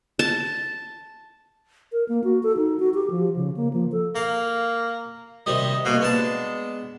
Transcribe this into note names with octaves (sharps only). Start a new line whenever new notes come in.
A5
A#4
A#3
F#4
A4
D#4
F#4
G4
F3
C#3
A#3
F3
A4
A#3 F5
C3 D#3 G3 D#5
C2 B2 A#3
G#3 B3 D4 A5